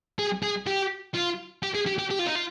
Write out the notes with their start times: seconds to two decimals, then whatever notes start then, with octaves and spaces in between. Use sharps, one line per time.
0.19 G#4
0.43 G#4
0.67 G4
1.15 F4
1.63 G4
1.75 G#4
1.86 G4
1.99 G4
2.11 G4
2.19 F4
2.27 D#4
2.35 F4